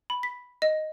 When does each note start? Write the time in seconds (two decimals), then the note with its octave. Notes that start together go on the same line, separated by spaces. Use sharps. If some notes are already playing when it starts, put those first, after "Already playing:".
0.10 B5
0.23 B6
0.62 D#5